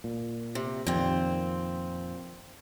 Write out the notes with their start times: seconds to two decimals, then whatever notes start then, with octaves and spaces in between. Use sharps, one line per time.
0.04 A#2
0.55 C3
0.87 F2 A#2 D#3 C4